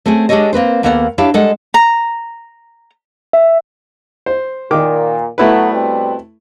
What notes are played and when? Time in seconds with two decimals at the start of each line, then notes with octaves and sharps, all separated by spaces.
0.06 A3 C4 C#4 G#4
0.29 G#3 D4 G4 A4 C#5 D#5
0.53 A#3 C4 B4 C5
0.83 D#2 A#3 B3 A4 D#5 F#5
1.18 D4 E4 G4 C#5 F5
1.34 G3 G#3 A4 F#5
1.74 A#5
3.33 E5
4.26 C5
4.71 A#2 D#3 D6
5.38 A2 F#3 A3 B3 E4 B4
5.70 B2 G3 C4